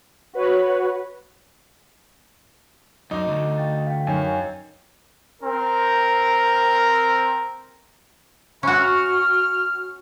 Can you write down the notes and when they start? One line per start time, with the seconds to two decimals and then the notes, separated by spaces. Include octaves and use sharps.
0.34 F#4 B4 C#5
3.11 F#2 D#4 D6
3.28 D2
3.58 F5 G5 A6
3.87 F5 G5
4.07 F#2 D#3 C#5 G#5
5.42 C4 A#4
8.63 C#4 F#4 B4 E5
8.78 F6